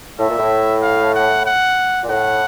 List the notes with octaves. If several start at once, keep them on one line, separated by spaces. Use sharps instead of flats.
A2 E5
A#2
A2
F5
F#5
F#5
A#2
A2 F#5